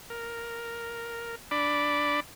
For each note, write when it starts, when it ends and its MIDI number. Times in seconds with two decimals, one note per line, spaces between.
0.10 1.35 70
1.51 2.20 62
1.51 2.20 74
1.51 2.20 83
1.51 2.20 86